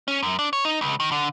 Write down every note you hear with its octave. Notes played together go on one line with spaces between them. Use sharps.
C#4
F#2
D4
C#5
D#4
C#2
D#3
D3